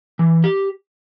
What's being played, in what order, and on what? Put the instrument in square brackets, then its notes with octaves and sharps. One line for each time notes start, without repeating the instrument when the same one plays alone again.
[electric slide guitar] E3
G4